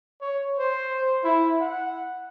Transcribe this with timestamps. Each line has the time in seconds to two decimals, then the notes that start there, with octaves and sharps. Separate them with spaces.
0.21 C#5
0.59 C5
1.24 E4
1.61 F#5